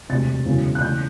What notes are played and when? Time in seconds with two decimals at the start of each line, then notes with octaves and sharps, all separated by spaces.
0.09 E1 D2 C3 A6
0.45 E1 E2 C#3 F#3 B3
0.75 F#6
0.82 C#3 E3 A3 G6